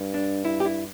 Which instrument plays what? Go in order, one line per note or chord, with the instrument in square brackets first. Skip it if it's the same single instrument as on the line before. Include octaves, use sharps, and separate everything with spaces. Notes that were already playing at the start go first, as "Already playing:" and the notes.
Already playing: [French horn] G2
[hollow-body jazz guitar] D4
E4
G4
E4